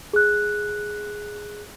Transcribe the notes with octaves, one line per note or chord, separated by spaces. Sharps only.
G#4 F#6